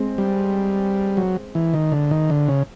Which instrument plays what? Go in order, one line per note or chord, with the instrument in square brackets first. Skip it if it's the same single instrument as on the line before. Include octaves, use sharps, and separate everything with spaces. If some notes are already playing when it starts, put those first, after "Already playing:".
Already playing: [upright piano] G#3 C4
[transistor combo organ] G3
F#3
E3
D#3
D3
D#3
D3
C#3